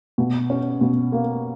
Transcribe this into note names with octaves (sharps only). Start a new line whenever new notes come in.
B2
C#4
B2
A#3